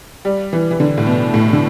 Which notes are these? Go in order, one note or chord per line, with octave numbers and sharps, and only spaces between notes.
G3
E3
E3
D3
A2
B2
A2
D3